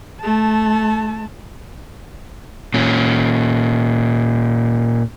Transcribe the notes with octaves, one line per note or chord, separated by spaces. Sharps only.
A3 A5
A#2 C#4